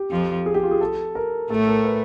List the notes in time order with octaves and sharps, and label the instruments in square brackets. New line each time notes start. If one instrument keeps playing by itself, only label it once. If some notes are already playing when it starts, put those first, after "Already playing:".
Already playing: [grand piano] G4
[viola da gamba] F2 F3
[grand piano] G#4
G4
F4
G#4
A4
A#4
[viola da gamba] A2 A3 [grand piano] A4
[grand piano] A#4
B4